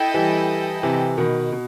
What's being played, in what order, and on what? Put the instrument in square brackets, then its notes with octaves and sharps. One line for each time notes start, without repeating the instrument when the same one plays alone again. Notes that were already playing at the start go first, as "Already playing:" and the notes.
Already playing: [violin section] E4 A4 D#5 G5
[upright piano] E3 G3
C3 E3
B2 D#3
B2